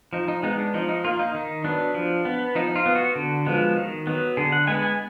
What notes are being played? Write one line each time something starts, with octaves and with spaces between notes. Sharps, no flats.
F3 D#4
D#4
G#3 B3 D#4
D4
F3 D#4
D#4
A#3 F4
D#4
D#3 D#4
F#3 B3 D4
F3
B3
F3 D#4
F4
B3
F#4
D3
F3 G#3 B3
D#3
F#3 B3
D3 G#4
F#5
G#3 B3 G#5
G#5